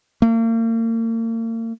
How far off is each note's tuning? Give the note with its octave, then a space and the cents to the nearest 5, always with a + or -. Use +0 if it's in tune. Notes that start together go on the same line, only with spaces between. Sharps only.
A#3 -40